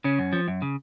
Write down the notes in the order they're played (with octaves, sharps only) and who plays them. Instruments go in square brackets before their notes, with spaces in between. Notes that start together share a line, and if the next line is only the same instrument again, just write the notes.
[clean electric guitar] C#3 C#4
F#2
F3
F#2
C#3